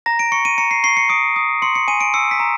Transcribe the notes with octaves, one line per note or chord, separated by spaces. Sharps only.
A#5 A#6
D7
C#6 C#7
D#7
A#5 C#7
C7
C#6 C7
C#7
D#6 D7
D#6
C6 C#7
C#7
G#5 D#7
D7
E6 C#7
B6
A#5